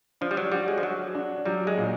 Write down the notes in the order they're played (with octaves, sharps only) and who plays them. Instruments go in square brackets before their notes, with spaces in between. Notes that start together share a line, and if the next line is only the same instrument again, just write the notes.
[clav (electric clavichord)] F3 [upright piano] D4
[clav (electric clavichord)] G3
F#3
[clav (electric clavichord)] G3 [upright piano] F#4
[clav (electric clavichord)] G#3
F3
[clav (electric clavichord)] F#3 [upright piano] F#4
[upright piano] D4
[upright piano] F#3 [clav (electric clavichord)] G3
[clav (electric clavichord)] G#3
[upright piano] A#2